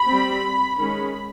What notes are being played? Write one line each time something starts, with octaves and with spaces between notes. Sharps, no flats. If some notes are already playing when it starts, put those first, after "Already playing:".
Already playing: B5
G3 C4
D#3 G#3 C#4 B5